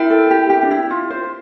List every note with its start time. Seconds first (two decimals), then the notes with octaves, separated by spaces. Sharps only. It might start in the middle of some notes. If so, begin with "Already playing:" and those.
Already playing: E4 A#4 E5 G5
0.10 A4
0.31 G4
0.50 G4
0.63 D4
0.71 E4
0.91 F4
1.10 C5